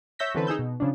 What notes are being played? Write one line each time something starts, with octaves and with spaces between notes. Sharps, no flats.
C#5 E5 E6 G6 A#6 B6
D3 E3 C4 C#4 A4 B4
D#4 G#4 E6 G6
B2
C#3 F3 C#4 D4